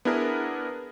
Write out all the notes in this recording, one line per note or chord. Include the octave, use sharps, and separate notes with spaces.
B3 D4 E4 G#4 A#4